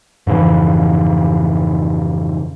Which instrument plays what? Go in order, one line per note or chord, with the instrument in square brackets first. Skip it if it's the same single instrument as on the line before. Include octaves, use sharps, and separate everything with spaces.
[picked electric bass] F2 G#2 C#3 E3